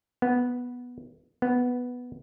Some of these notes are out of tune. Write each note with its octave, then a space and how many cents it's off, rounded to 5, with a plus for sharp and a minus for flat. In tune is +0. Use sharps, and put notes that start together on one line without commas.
B3 -5
B3 +0